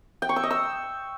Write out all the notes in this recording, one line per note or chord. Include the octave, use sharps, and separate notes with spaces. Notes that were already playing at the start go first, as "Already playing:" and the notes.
G5
C#6
E6
D#5
E6